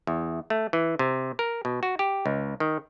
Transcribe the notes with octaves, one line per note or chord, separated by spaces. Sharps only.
E2
A3
E3
C3
A#4
B2
F#4
G4
C#2
D#3